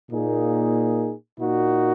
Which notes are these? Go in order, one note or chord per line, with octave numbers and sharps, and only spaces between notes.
A#2 A#3 D#4 G#4
A#2 A#3 D#4 F#4